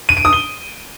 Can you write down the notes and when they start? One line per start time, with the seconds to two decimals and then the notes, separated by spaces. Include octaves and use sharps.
0.09 D#7
0.17 D7
0.25 D#6
0.33 G7